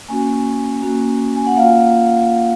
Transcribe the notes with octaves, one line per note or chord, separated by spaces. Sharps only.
A#3 C#4 F#4 G#5
A#3 C#4 F#4
G#5
F#5
A#3 F4 F5